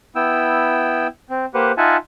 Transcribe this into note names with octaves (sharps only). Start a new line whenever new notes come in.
B3 E4 G5 E6
C4
A#3 G4 B4 C5 F#5
D#4 F4 E5 F#5 G#5 A5